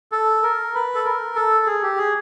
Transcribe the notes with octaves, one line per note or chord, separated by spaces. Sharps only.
A4
A#4
B4
A4
A#4
A4
G#4
G4
G#4